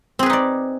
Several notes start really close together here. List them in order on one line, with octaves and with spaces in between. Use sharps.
C4 G#4 B4 D#4 D5